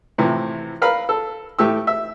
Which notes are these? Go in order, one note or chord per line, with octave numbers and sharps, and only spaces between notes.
A2 C3 E3 F3
A#4 B4 F5 B5
A4
A2 A3 G4 E6
E5